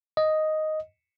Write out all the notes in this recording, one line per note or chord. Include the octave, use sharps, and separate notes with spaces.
D#5